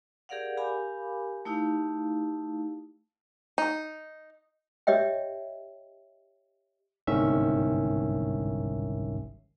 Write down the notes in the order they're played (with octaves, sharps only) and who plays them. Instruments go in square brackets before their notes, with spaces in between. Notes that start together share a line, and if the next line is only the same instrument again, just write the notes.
[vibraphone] G4 G#4 A#4 D5 F5 F#5
G4 A#4 F5 G#5 B5 D6
A3 D#4 E4 G4 F5
[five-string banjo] D#4
[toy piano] G4 C#5 D#5 E5 G5
[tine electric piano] G1 C2 G#2 D#3 C#4 E5